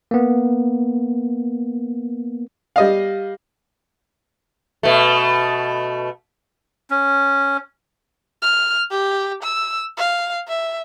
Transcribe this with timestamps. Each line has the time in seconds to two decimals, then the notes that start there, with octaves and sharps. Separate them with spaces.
0.11 A#3 B3
2.76 G3 D#5 F5
4.83 B2 A3
6.90 C#4
8.42 F6
8.91 G4
9.43 E6
9.97 F5
10.48 E5